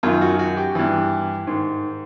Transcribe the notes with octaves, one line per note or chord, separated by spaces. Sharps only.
F#2 D#3 F4
F#4
F#4
G4
G2 E3
G#2 D#3